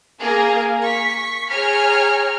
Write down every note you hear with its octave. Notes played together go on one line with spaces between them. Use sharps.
A#3 G#4 A#4
C#6 B6
G#4 C#5 G5 G#5 A#5 F6